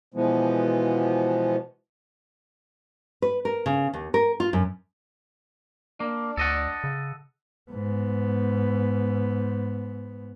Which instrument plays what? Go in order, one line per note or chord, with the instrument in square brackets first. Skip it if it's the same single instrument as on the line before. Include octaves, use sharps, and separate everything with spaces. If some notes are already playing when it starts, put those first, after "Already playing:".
[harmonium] B2 E3 F3 G#3 B3
[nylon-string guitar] B4
A#4
C#3
D#2
A#4
F4
F#2
[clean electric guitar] A#3 [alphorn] D4
[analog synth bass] D2 [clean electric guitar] A4 D#5 F#5
[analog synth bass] C#3
[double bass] G#2 B3